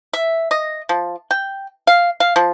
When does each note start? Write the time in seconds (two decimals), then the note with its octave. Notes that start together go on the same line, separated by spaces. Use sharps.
0.13 E5
0.51 D#5
0.89 F3
1.31 G5
1.87 F5
2.20 F5
2.36 F3